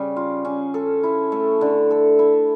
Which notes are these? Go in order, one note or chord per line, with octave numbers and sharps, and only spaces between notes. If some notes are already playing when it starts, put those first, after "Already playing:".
Already playing: C#3 G3
F4
C#4
A4
E4
A3
D3
A4
E4